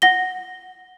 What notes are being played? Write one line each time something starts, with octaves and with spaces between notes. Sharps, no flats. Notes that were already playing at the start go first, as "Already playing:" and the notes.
F#5 A#6 G7